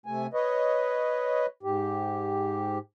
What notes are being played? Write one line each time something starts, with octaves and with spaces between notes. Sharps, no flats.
C3 A3 G#5
B4 C#5 D#5
G#2 G4